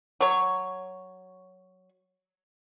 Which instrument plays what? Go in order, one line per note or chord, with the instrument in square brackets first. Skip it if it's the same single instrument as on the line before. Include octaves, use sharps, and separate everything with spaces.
[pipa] F#3 C#5